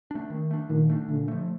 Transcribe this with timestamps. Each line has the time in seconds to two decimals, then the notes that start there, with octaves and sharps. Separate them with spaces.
0.11 A3 D4
0.30 D#3
0.51 A3 D4
0.70 A#2 D#3
0.90 A3 D4
1.08 A#2 D3
1.28 F3 A3